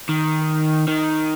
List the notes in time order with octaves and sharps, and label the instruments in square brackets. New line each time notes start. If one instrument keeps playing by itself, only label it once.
[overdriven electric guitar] D#3
D#3